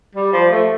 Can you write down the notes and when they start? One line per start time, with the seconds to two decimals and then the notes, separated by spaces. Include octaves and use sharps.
0.15 G3
0.33 F3
0.51 A3